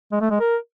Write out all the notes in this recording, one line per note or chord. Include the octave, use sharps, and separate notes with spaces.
G#3
A3
G#3
A#4